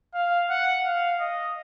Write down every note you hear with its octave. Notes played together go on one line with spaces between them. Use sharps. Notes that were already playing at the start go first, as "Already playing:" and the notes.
F5
F#5
F5
D#5